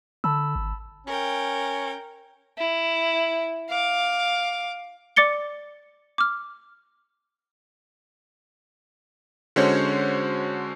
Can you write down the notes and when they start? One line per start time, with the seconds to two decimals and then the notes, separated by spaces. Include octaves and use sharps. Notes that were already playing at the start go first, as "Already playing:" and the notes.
0.24 D3 A5 B5 E6
0.56 G#1
1.07 C#4 A#4 G5
2.58 E4
3.70 F5 D6
5.16 D5 D6 A6 C#7 G7
6.18 D6 F6
9.56 D3 G#3 C#4 F#4 C5 C#5